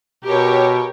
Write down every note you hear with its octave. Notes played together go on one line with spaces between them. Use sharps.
B2 G4 A#4 C#5